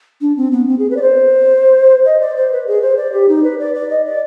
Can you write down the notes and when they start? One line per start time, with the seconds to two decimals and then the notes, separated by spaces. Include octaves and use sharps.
0.21 D4
0.36 C4
0.51 B3
0.67 C4
0.78 G#4
0.90 B4
0.96 D5
1.02 C5
2.05 D#5
2.21 D5
2.36 C5
2.52 B4
2.67 G#4
2.82 C5
2.97 D5
3.12 G4
3.28 D#4
3.43 B4
3.59 D5
3.74 D5
3.90 D#5
4.05 D5